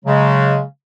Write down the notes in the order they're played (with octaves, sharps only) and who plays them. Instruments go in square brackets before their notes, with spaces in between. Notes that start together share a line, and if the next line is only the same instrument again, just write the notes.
[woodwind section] C#3 F#3 G#3